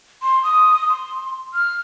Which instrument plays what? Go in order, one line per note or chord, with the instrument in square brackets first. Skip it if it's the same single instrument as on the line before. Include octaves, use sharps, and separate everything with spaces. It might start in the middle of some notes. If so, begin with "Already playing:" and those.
[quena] C6
D#6
C6
F6